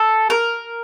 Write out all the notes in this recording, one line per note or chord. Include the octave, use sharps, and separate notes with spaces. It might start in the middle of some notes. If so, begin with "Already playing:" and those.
Already playing: A4
A#4